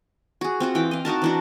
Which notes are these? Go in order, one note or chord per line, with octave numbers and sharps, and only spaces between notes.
F#4 G#4
C4 F4 F#4
E3 G5 D6
D#5 F5
D#4 F#4 A#4 A5
E3 D4 F#4